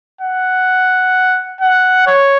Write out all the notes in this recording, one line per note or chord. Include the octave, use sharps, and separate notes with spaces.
F#5
F#5
C#5